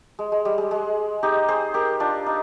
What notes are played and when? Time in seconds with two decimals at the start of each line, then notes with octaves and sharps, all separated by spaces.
0.19 G#3
0.32 G#3
0.45 G3
0.58 G#3
0.71 G#3
1.23 D#4 G4
1.48 G#4 C5
1.74 G4 A#4
2.00 D4 F4
2.26 D#4